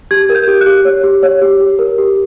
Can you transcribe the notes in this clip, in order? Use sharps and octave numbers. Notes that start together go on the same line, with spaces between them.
G4 G#6
A#4
G6
G4
F#6
G4
C#5
G4
C#5
G4
G4
A#4
G4